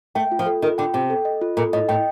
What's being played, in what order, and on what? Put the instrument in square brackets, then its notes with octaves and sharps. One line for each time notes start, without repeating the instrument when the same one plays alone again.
[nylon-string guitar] A3 [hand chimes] G5
[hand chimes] F4
[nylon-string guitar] F3
[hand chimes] A4
[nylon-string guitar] D#3 [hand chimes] F4
[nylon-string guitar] D3 [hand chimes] G5
[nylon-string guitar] C3 [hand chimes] G5
[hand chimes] A4
D#5
F4
[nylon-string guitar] A#2 [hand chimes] A4
[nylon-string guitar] A2 [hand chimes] D#5
[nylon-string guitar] A2 [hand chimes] G5